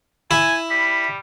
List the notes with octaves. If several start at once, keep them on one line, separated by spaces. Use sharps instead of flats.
E4 G#5
G3 B6